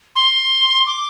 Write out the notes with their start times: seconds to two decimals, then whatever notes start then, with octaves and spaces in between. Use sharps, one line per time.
0.16 C6
0.86 D6